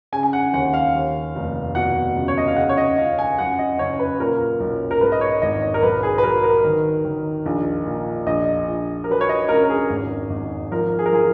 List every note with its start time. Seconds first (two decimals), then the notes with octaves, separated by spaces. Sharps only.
0.12 C#3 G#5
0.23 G#5
0.33 F#5
0.54 D#2 F#5
0.74 F5
0.95 D#2
1.35 F1
1.75 B2 F#5
2.16 C#2
2.28 C#5
2.38 D#5
2.47 F5
2.56 C#3 F#5
2.69 C#5
2.77 D#5
2.97 C#2 F5
3.19 G#5
3.38 F#2 F#5
3.59 D#5
3.79 F#1 C#5
3.99 B4
4.20 A#2 A#4
4.60 B1
4.91 A#4
5.01 G#2 B4
5.12 D#5
5.21 C#5
5.42 G#1 D#5
5.74 A#4
5.82 B1 B4
6.03 G#4
6.18 B4
6.23 F#3 A#4
6.44 A#4
6.64 D#3
7.05 D#3
7.46 A#1
7.86 A#2
8.26 A#1 D#5
8.68 A#1
9.04 A#4
9.09 F#3 B4
9.21 C#5
9.29 D#5
9.49 C#2 A#4
9.64 A#4
9.70 G#4
9.90 G#1
10.30 G#1
10.71 F3 A#4
10.99 G#4
11.06 A#4
11.12 F3 G#4